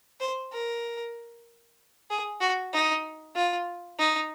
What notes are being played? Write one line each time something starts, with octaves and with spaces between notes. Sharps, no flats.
C5
A#4
G#4
F#4
D#4
F4
D#4